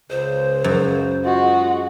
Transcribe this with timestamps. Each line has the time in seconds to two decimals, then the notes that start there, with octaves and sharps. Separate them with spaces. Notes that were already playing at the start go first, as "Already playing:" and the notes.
0.10 C#2 C#3 C5
0.64 F#2
1.25 G#3 F4 F#4